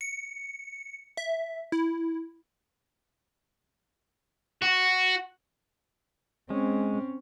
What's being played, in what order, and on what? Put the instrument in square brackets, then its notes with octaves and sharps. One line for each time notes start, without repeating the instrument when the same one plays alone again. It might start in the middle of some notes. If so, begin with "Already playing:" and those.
[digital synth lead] C#7
E5
E4
[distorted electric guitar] F#4
[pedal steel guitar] G#3 [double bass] C4 C#4